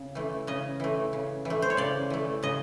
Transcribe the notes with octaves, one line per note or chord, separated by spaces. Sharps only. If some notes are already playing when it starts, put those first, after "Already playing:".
Already playing: C#3
E3 A3
C#3 D#5
E3 A3
C#3
E3 A3
C5
C#5
C#3 D5
E3 A3
C#3 D#5